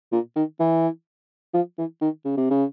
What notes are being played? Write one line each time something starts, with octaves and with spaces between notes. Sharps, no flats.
A#2
D#3
E3
F3
E3
D#3
C#3
C3
C#3